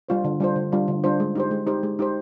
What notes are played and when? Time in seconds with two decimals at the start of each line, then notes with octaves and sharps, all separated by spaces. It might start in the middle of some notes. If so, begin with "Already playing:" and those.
0.09 G3 D4 F4 C5
0.24 D3
0.40 G3 D4 F4 C5
0.56 D3
0.72 G3 D4 F4 C5
0.88 D3
1.04 G3 D4 F4 C5
1.20 G#3
1.36 D#4 G4 C5
1.51 G#3
1.67 D#4 G4 C5
1.83 G#3
1.99 D#4 G4 C5